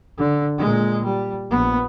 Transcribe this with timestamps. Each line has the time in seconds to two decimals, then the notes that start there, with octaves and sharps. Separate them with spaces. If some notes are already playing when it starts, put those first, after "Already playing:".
0.18 D3
0.58 A#2 G#3
1.04 G3
1.50 A#1 B3